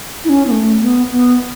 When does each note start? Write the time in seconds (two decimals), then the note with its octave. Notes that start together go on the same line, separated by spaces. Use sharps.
0.24 E4
0.29 C#4
0.47 B3
0.51 A3
0.82 B3
1.12 B3